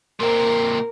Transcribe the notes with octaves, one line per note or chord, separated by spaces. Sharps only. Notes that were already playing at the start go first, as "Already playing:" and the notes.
A#2 C4 A#4